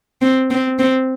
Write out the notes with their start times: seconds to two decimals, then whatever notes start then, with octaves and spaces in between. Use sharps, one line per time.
0.21 C4
0.51 C4
0.79 C4